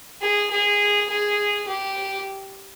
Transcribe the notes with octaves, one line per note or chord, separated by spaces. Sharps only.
G#4
G#4
G#4
G4